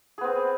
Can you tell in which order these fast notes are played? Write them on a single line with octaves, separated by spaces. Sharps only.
G#4 B3 C4